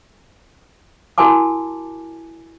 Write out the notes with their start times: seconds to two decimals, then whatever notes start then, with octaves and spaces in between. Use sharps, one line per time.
1.18 E4 F#4 A#4 G#5 A5 D6